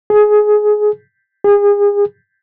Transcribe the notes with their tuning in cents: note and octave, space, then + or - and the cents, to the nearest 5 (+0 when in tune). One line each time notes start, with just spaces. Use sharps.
G#4 +20
G#4 -30